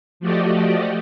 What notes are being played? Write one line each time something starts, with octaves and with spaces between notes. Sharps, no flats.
F3 A3 F#4 G4 D5 D#5